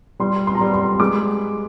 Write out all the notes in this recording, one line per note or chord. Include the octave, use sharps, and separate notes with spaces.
G3 C6
C6
A#5
G3 C6
C6
G#3 D6